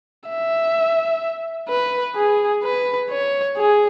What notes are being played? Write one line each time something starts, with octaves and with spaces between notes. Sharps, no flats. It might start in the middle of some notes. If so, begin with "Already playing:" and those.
E5
B4
G#4
B4
C#5
G#4